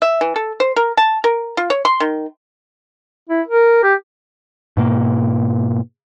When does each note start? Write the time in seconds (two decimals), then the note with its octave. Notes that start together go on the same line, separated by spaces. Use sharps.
0.02 E5
0.21 E3
0.36 A4
0.60 C5
0.76 A#4
0.97 A5
1.24 A#4
1.57 F4
1.70 C#5
1.85 C6
2.00 D#3
3.29 E4
3.48 A#4
3.83 G4
4.77 G#2 B2 A#3